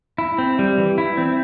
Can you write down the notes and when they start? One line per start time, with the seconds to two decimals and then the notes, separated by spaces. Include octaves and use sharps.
0.18 E4
0.38 C4
0.59 G3
0.78 E3
0.98 E4
1.17 C4